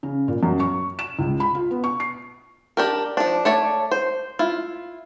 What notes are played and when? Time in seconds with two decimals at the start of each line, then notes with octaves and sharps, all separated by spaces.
0.03 C#3
0.28 A#2
0.43 F#2
0.60 C#6
0.99 E7
1.19 C#2
1.40 B5
1.55 F4
1.71 B3
1.84 C#6
2.00 C7
2.77 D4 G4 A#4
3.17 F3 D4
3.45 A3 C#5 D5
3.91 C5
4.39 E4 F4